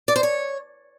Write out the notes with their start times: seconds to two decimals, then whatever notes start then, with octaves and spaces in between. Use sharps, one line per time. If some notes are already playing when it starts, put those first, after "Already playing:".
0.08 D5
0.16 C5
0.23 C#5